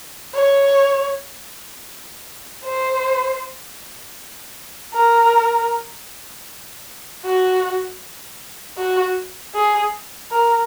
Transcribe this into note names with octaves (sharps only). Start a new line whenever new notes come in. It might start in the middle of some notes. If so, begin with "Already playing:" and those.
C#5
C5
A#4
F#4
F#4
G#4
A#4